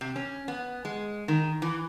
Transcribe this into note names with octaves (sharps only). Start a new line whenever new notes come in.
C3
C#4
B3
G#3
D#3
E3